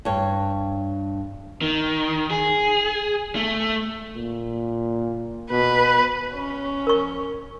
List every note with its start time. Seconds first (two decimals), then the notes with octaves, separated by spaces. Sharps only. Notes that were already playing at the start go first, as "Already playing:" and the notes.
0.05 G2 C#5
1.62 D#3
2.31 G#4
3.36 A3
4.16 A#2
5.51 B2 B4
6.35 C#4
6.87 A#4 C#6